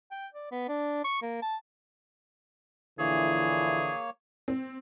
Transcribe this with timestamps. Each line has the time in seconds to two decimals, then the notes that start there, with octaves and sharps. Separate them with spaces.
0.12 G5
0.34 D5
0.52 B3
0.69 D4
1.04 C#6
1.22 A#3
1.42 A5
2.99 A#1 D3 E3 A#3 G#4 C#5
4.48 C4